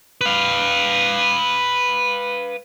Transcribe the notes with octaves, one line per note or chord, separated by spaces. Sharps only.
B4 F5